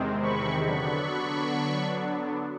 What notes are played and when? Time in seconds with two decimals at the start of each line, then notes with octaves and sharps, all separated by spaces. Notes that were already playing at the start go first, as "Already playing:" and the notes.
Already playing: E2 C3 D#3 G#3 C4
0.23 B5 C#6
0.66 D3 F#3 B3 D4 B5 C#6